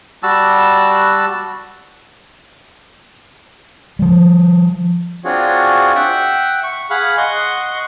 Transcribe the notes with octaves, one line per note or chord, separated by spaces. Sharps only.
G3 F#4 A5 E6
F3 G3
C4 D4 F4 F#4 G#4 C#5
E5 F#5 G5
C#6
G#4 F5 F#5 B5
D#5 F#5 C6 C#6